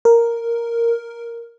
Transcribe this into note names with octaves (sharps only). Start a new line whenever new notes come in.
A#4